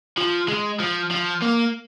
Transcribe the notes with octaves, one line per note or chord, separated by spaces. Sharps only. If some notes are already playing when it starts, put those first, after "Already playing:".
F3
G#3
F3
F3
A#3